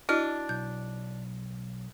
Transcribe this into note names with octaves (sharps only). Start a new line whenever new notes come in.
D4 E4 F#4 D#5 F6
B1 G6